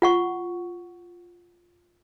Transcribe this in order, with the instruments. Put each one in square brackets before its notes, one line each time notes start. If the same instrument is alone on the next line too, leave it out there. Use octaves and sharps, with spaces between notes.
[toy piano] F4 F#5 C#6